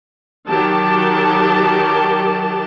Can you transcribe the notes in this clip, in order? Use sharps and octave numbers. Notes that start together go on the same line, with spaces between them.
D#3 F#3 G4 A5